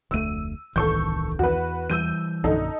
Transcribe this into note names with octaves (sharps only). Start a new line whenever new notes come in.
F1 D2 A3 E6 D#7
D#1 C2 A2 D#3 E3 A4 C#6 G6
E2 F#4 B4
E3 G3 E6 G6 D#7
A#1 F#2 D3 D#4 A4